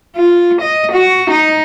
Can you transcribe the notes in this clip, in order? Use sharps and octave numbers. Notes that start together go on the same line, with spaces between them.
F4
D#5
F#4
D#4